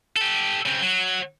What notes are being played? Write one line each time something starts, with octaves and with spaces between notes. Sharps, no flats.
G4 A4
C#3 C4
F#3